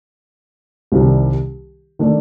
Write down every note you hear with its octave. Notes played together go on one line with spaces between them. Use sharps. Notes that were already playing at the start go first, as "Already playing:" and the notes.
C2 C3 D#3 G3
D#3 A3 D4